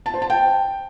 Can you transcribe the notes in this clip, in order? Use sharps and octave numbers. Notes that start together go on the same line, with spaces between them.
A5
C5
A5
G5